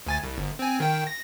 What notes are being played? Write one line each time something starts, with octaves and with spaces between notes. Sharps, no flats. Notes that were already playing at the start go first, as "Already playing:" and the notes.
D2 G#5 A6
C2
G1
C4 G#5
D#3 G5
A#6